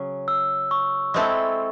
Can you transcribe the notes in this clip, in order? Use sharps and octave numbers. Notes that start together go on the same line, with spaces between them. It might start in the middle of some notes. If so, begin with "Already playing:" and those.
Already playing: C#3 F#3 C#4 G#4
E6
C#6
G#3 C4 E4 A4